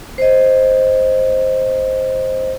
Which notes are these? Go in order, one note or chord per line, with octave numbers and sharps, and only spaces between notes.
C5 D#5